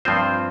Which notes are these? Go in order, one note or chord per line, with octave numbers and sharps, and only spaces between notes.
G2 F3 C4 F4 C5